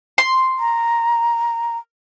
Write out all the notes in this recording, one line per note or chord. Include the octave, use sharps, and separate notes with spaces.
C6
A#5